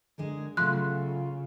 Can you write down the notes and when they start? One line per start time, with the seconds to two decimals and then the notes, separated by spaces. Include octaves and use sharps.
0.18 D3 G#3 G#4 A#4
0.57 C#3 F#3 A3 F4 C6 F#6